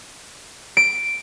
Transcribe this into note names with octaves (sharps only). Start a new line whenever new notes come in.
D7